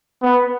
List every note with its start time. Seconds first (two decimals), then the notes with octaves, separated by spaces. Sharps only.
0.22 B3